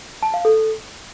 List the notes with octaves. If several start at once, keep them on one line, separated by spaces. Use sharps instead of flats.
A5
F5
A4